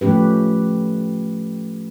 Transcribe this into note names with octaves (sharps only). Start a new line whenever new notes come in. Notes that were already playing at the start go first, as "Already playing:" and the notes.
F3 A3 C#4 G4 B4